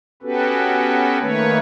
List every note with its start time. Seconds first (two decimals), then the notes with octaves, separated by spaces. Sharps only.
0.23 B3 C#4 F#4 G4 A4 B4
1.20 D#3 A3 A#3 B4 C#5